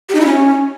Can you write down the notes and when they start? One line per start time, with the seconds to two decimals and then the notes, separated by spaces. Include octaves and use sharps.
0.09 G4
0.15 D#4
0.20 E4
0.26 C#4